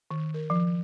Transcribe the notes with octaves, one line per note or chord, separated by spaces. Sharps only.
D#3
A#4
F3